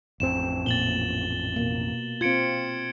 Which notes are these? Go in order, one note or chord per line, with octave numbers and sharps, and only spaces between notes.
A1 F2 C4 E7
A#2 A6 F#7 G7
B2 A#3
C4 F4 G#6 C#7 D7